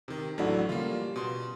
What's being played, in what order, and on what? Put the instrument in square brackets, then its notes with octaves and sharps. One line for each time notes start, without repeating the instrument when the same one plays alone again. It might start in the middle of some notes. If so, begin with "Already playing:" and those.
[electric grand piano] C3 D#3 [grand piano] D#4
[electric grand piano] A1 F#3 E4 [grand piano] A3 D4 F#4
[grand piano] C#3 G3 [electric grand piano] A#3 F4
[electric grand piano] B2 C6